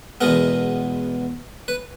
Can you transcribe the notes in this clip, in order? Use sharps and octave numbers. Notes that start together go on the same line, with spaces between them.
E2 B2 G#3 B3 A#4
B4